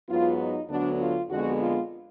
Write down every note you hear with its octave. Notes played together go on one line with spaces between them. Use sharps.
G#2 F#3 B3 F4
D#4
D2 D3 F#3 B3 D4
F4
F2 D3 G#3 B3 F#4
F4